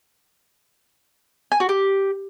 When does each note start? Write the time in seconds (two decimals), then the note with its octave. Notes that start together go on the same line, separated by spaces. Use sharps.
1.52 G#5
1.60 F#4
1.69 G4